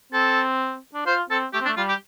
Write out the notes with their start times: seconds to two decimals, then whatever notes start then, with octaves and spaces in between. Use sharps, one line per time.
0.12 C4 A4
0.94 D4
1.06 F4 C5
1.30 C4 A4
1.53 A3 G4
1.61 C4
1.65 D4
1.68 A3
1.77 G3 F4
1.88 G4